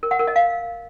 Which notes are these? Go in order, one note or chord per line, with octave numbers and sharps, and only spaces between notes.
A#4
F#5
A#4
D#5
F5